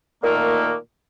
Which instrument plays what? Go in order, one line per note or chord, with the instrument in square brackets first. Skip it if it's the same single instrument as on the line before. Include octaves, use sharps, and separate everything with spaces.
[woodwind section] A#2 D#3 A3 A#3